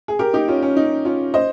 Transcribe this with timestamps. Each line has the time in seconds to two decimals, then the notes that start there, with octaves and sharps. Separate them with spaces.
0.08 G#4
0.19 G4 A#4
0.33 D#4 G4
0.48 C#4 F4
0.62 C#4
0.76 D#4
1.05 C#4 F4
1.34 C5 D#5